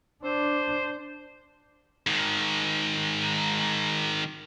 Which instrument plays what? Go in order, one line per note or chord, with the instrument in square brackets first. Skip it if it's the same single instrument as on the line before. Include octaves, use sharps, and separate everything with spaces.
[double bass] D4 [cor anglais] C5
[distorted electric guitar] G#2 D#3